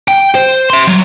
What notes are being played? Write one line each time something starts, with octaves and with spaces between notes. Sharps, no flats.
G5
C5
E5 C6
F#3